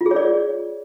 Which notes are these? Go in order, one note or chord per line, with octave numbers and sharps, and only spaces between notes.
F4
G#4
C#5
D5